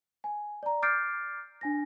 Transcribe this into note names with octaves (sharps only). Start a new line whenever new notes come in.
G#5
D5 A#5
D6 F6 G6 A6 C7 D7
D4 G#5 A#6